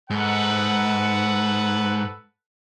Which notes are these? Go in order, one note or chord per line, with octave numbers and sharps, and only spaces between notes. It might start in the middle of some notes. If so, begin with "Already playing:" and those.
G#2 A4 B4 F#5